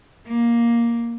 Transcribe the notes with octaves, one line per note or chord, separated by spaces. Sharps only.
A#3